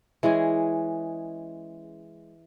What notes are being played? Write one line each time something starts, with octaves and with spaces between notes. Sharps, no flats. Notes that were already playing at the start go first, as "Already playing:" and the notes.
E3 G#3 C#4 G#4